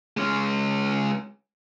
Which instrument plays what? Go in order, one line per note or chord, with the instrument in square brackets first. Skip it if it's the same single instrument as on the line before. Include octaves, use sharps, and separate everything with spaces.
[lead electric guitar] G#3 C#4